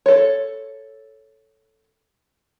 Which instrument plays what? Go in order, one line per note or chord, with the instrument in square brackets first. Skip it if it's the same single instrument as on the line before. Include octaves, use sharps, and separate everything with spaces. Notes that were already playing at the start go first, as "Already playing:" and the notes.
[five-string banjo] A4 C#5